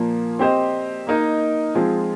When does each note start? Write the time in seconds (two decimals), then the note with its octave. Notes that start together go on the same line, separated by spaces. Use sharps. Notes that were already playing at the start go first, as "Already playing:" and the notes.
Already playing: A#2 F3 A#3
0.39 C4 G4 C5 D#5
1.07 A#3 D#4 A#4 D#5
1.75 F3 G#3 C4 F4 G#4